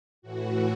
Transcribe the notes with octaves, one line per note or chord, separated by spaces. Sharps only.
A2 E3 F#4